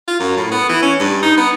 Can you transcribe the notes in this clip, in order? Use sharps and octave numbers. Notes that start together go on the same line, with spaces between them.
F4
F#2
A2
B3
E3
C#4
G2
D#4
B3